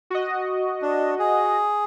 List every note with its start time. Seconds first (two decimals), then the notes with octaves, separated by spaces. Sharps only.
0.10 F#4 D#5
0.82 D4
1.19 G#4